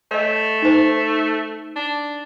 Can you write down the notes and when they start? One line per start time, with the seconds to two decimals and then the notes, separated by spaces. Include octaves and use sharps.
0.11 A3 C#5 D#5
0.62 D#4 C5
1.76 D4